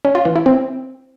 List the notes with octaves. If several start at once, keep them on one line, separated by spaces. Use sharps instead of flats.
C#4
F4
E3
E4
C4